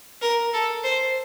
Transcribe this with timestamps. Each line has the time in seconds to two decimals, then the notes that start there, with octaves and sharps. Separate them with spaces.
0.22 A#4
0.53 A4
0.84 C5